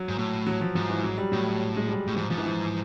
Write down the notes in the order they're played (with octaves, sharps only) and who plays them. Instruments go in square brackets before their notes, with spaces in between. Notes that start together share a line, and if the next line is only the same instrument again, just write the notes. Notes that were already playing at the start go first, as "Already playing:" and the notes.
Already playing: [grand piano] F#3
[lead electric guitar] G#2
A2
[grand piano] F#3
F3
[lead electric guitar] G#2 [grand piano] F3
[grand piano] E3
F#3
G3
[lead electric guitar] A2 [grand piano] F#3
[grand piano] G#3
G3
[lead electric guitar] A2
[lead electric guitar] G#2 [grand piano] F3
[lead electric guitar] G#2 [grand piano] F3
[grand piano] E3
F3